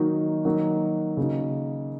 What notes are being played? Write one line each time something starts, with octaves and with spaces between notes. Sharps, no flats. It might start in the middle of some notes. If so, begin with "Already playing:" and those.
Already playing: D#3 F#3 A#3 D#4 F#4
D#3 F#3 A#3 D#4 F#4
C#3 A#3 D#4 F#4